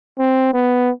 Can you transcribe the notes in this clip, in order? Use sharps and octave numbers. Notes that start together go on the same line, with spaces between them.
C4
B3